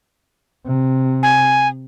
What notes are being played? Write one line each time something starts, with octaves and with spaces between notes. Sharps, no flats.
C3
G#5